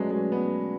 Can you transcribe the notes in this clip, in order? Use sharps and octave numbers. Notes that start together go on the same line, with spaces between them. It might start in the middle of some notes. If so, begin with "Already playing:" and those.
Already playing: F#3 G#3 A3 C#4 F#4 B4 D5
G#3
B3